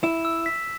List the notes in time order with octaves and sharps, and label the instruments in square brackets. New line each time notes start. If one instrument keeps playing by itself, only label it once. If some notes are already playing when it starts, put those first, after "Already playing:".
[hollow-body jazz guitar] E4 [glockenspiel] E7
[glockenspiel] E6
B6